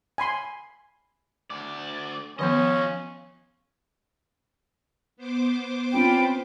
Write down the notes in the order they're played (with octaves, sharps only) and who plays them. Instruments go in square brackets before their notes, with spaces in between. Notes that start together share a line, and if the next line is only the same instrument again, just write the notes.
[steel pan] G#5 B5 C6
[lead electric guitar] D2 D5
[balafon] D#3 F3 B3 [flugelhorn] C#4 [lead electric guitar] F4 D#5
[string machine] B3 C5 D6
[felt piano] C4 C#4 [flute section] F4 G5 B5